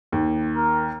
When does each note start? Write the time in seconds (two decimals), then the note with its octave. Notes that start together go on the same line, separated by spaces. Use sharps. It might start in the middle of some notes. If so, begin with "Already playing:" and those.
0.12 D#2
0.54 A#4